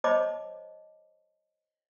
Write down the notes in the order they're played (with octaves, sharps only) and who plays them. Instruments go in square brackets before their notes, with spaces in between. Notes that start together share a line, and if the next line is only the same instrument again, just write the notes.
[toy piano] C5 C#5 D#5 A5 B5 D6